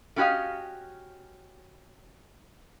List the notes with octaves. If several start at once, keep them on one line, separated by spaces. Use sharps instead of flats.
A3 C#4 F#4 G4 D#5 F5